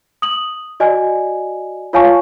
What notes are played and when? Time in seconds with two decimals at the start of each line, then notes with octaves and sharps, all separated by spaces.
0.22 D#6 F#7
0.80 F#4 D5 D#5 G#5
1.93 F4 C#5 F5 G#5 A5 C#6